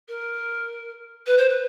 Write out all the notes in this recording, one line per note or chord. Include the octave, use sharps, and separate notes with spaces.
A#4
B4
C5
B4